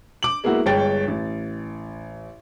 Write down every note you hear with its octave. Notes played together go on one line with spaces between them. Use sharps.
D6 F#7
G#3 A#3 B3 E4 F#4
G1 G#3 C#5 G5 A6
A1